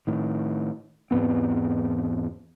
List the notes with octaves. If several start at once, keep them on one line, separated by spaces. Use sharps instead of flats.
A2 D#3
E2 G#2 B3 C4